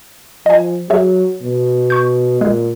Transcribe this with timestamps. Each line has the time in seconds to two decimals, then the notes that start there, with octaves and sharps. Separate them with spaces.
0.46 F3 D#5 G#5
0.90 F#3 G#4 C#5 E5
1.43 B2
1.90 C#6 G6
2.41 A#2 G#3